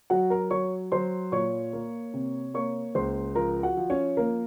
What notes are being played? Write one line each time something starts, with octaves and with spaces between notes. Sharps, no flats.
F#3 F#4 F#5
A#4 A#5
F#3 C#5 C#6
F#3 C5 C6
A#2 C#5 C#6
A#3
C3
A#3 C#5 C#6
C#2 C5 C6
F3 A#4 A#5
F#4 F#5
F3
C#4 C#5
A#3 A#4